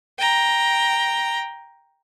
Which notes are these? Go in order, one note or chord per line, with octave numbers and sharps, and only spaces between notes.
G5 A#5